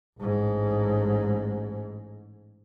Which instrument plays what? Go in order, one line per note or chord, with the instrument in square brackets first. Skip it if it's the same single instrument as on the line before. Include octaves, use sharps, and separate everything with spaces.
[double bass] A1 G#2